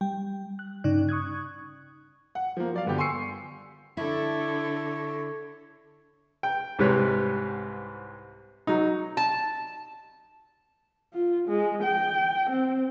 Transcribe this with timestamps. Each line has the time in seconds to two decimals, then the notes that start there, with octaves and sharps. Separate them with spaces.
0.01 G3 G5
0.59 F#6
0.84 G2 C#3 D#4 D5 F#6
1.09 C#6 D#6 F#6 G#6
2.35 F#5
2.57 F3 A#3
2.74 F#3 D5 F5
2.86 G2 D3 B3 G4
2.98 G#5 C6 C#6 E6 C7 C#7
3.97 D3 E4 A4 C#5
6.43 G5
6.79 C2 G#2 C3 G3 B4 C#5
8.67 F#3 D#4
9.17 A5
11.14 F4
11.49 G#3
11.83 G5
12.50 C4